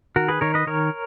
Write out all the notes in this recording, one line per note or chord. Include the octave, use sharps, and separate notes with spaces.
D#3 F#4 A#4
G#4 B4
D#3 A#4 C#5
B4 D#5
D#3 A#4 C#5